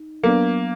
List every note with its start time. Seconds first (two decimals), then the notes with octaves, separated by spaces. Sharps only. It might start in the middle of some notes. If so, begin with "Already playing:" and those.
Already playing: D#4
0.23 F#3 A#3 B3 D4